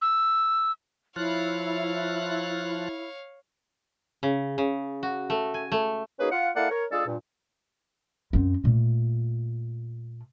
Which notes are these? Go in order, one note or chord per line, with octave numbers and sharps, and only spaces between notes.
E6
F3 E4 F4 C#5 F5 F#6
C#3
C#3
F#4
A3
G#5
A3
A#3 C#4 D#4 F#4 G#4 B4
F4 F#5
A#3 E4 A4 D5 F5 F#5
A#4 C#5
G#3 D4 F4 G#4 A4
G2 A#2
F#2 C4
A#2 A3